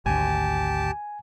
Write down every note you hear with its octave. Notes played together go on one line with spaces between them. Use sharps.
G#1 D2 G4 G#5 A5